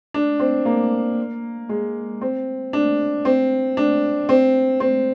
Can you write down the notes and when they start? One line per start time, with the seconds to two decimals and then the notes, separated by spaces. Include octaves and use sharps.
0.14 D4
0.40 C4
0.65 A#3
1.69 G#3
2.21 C4
2.73 D4
3.25 C4
3.77 D4
4.29 C4
4.80 C4